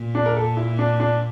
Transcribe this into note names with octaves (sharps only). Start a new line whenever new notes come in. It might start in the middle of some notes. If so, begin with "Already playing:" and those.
Already playing: A#2
D4
A#4
A4
E4
D4
D4